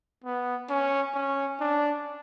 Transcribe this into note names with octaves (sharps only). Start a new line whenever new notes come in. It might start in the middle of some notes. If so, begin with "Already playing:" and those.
B3
C#4
C#4
D4